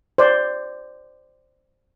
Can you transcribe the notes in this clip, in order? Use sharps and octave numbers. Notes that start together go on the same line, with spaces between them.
C5 D5